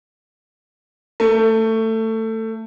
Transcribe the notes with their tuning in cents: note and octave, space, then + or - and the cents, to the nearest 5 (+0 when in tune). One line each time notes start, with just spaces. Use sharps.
A3 +20